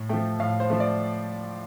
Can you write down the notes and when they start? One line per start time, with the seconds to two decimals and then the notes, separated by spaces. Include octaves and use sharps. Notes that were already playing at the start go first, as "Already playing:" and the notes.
Already playing: A2
0.09 F3 A3 G5
0.40 A2 F5
0.60 C5
0.70 F3 A3
0.80 D5